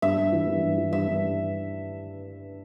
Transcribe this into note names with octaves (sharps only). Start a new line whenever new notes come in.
G2 E5
G2
E3
G2
G2
E3
G2 E5
G2